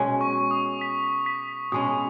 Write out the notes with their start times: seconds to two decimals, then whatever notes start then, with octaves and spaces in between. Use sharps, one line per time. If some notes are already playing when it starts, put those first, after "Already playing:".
Already playing: B2 G#3 C#4
0.21 C#6
0.51 D#6
0.81 B6
1.26 B6
1.72 B2 G#3 C#4 D#6